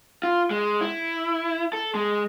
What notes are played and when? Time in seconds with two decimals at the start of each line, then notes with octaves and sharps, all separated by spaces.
0.23 F4
0.51 G#3
0.81 E4
1.73 A4
1.95 G#3